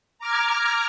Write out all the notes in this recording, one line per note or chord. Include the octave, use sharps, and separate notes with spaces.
A#5 D6 F6 G#6